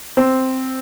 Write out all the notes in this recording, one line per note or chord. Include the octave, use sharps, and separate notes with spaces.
C4